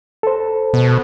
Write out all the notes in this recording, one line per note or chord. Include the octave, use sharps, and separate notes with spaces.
A4 C5
B2